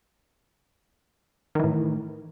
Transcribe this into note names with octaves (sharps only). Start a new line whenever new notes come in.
A2 D#3 E3